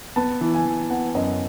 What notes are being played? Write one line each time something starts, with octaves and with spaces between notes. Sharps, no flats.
B3 A5
E3
G#5
E3
B3 F#5
F#2 D#5